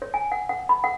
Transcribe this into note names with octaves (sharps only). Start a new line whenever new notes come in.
C#5
G#5
F#5
F#5
B5
F#5